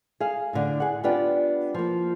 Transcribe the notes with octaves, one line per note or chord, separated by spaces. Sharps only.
G#4 F5
A2 D3 D4
G#4 F#5
B3 D4 F4 G4 D5 G5
F3 A#3